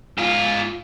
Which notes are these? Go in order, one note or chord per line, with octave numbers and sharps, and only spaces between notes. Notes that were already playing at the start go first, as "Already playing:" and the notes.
G#2 F4